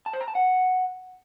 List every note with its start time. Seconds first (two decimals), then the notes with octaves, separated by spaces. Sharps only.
0.06 A5
0.13 C5
0.21 A#5
0.28 A5
0.35 F#5